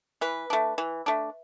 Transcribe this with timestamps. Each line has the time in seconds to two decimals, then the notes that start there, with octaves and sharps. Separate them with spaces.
0.21 E3 B4
0.50 A3 D4
0.78 E3
1.06 A3 D4